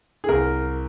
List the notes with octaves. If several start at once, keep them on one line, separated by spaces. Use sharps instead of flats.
G#4
C2 A#4